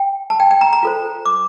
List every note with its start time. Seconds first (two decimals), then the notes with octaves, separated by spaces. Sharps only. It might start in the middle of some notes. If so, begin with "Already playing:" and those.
Already playing: G5
0.30 A5
0.40 G5
0.51 G5
0.61 A#5
0.73 A#5
0.83 F4 A4 C5
1.26 D6